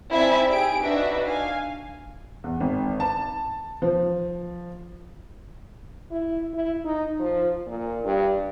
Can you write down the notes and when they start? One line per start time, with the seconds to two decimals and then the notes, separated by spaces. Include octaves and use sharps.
0.12 C4 D#4 E4 D5 E5 G#5
0.49 G4 G#4 D7
0.81 D4 D#4 F#4 B4 E5
1.24 F5 G#5
2.44 E2
2.60 G#1
3.00 A5
3.82 F3
6.11 E4
6.54 E4
6.85 D#4
7.20 F3
7.67 A#2
8.05 G2